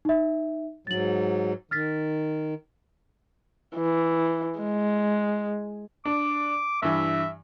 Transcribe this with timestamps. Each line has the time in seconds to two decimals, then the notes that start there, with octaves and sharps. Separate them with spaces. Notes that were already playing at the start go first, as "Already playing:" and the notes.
0.05 D#4 E5
0.87 G#2 F#3 A6 F#7
1.71 D#3 F6 A6 B6
3.76 E3
4.60 G#3
6.05 D4 D6
6.82 G2 E3 E5